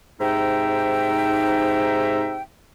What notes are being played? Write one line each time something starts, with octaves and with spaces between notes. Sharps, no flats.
G#2 C3 D#4 E5 G5